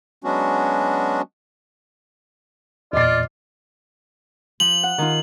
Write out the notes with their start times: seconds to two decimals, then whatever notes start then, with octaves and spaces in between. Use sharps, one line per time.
0.24 F#3 G#3 B3 C#4 D4 F#4
2.93 E2 A#2 F4 D5 D#5 C7
4.60 F3 F#7
4.83 F#5
4.98 D#3 F4